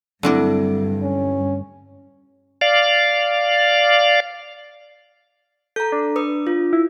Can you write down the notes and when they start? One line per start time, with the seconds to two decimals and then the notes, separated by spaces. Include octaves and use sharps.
0.23 G2 D3 F#3 A3 C4 D4 E4
1.02 C#4
2.61 D5 F5
5.76 A4 A#5 G6
5.92 D4
6.16 B4 D#6
6.47 F4
6.73 E4